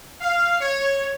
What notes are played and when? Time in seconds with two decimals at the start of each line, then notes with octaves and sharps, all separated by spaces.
0.21 F5
0.61 C#5